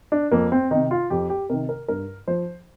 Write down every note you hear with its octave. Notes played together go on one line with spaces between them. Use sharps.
D4
F2 A#3
C4
C3 D#3 D#4
F4
F2 G4
G4
C3 D#3 A#4
A#4
G2 A#4
F3 C5